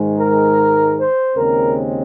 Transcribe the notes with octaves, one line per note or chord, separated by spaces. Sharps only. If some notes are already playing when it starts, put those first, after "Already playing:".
Already playing: G#2 D#3 G#3
A#4
C5
D#2 C#3 G#3 C4 A#4